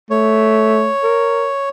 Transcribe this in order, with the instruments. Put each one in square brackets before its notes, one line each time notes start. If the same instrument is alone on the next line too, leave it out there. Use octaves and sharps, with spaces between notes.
[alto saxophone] A3 [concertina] C#5
[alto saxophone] A#4